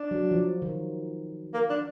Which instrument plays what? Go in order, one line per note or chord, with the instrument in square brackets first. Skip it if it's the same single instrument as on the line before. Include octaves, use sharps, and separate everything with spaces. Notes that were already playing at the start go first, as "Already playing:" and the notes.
Already playing: [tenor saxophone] D4
[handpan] F#3
F3
D#3
[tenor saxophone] A#3
D4